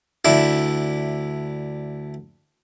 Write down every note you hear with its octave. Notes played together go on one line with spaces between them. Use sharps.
D2 D4 E4 E5